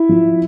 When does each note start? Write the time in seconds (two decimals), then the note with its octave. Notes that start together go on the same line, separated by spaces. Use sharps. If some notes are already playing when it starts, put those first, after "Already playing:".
Already playing: E4 E5
0.09 F3